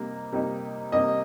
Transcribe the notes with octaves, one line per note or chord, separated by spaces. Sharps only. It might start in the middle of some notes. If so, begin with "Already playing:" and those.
Already playing: C3 G3 A#3 D#4
C3 G3 A#3 D#4
C3 G3 A#3 D#4 D#5